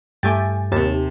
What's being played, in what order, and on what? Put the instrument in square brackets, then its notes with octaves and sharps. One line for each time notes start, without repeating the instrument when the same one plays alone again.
[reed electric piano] G2 [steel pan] A3 G4 G5 [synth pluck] G#5 A6
[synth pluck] D#2 [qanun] C3 A5